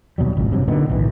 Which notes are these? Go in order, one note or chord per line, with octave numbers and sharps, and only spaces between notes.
D#2 B2 F#3 G3
G#1 C#2
G2 C3 F#3
A#2 D3 D#3 B3
D1 B1 E3